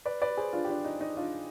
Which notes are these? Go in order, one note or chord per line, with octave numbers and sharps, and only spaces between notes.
B4 D5
B4 D5
G#4 C5
D4 F4
G4
D4 F4
D#4
D#4
D4 F4